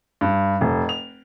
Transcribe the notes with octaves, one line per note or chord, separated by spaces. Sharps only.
G2
F1
F7